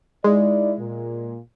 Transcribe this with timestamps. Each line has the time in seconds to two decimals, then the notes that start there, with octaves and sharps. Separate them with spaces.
0.24 G#3 D#4 E4 D5
0.79 A#2